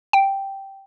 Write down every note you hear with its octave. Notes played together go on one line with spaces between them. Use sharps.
G5